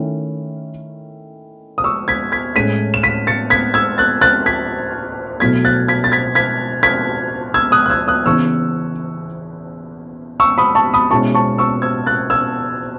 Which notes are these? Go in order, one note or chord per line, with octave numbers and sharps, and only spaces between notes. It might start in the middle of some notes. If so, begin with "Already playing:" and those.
Already playing: D#3 A3 C#4 E4
D#6
C#6 E6
G#6 B6
G#6 B6
A2 G#3 C#4 B6 D#7
E7
B6 D#7
A6 C#7
G#6 B6
E6 G#6
F#6 A6
F#6 A6
G#6 B6
B2 F#3 A3 E4 G#6 B6
F#6 A6
G#6 B6
A6
G#6 B6
G#6 B6
G#6 B6
E6 G#6
D#6 F#6
F#6
E6 G#6
D#6 F#6
C#3 E3 B3 C#6 E6
C#6 E6
B5 D#6
A5 C#6
B5 D#6
B2 G#3 C#4 E4 A5 C#6
A5 C#6
C#6 E6
E6 G#6
F#6 A6
E6 G#6